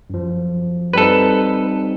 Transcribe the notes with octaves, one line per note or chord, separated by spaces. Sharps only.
F#2 F3
G3 C4 D#4 A4 B4